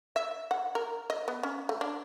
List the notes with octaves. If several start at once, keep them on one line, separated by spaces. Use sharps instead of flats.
E5
F#5
A#4
D#5
B3
C#4
A3
D4